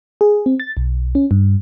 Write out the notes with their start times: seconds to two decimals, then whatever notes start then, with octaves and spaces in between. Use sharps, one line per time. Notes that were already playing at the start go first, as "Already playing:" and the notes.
0.21 G#4
0.46 C4
0.60 A6
0.77 B1
1.15 C#4
1.31 G2